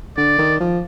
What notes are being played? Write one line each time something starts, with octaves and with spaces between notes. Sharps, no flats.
D3 D5
D#3
F3